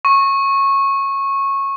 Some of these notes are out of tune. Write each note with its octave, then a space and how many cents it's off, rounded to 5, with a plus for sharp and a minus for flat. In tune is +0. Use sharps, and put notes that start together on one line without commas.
C#6 -20